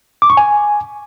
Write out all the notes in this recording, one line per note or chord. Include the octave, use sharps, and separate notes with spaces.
D6
C#6
G#5